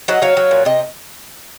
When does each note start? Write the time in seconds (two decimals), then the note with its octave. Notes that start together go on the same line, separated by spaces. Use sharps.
0.08 F#3 D#5 F#5
0.22 F#3 C#5 F5
0.37 F#3
0.51 A#2
0.65 C3 D#5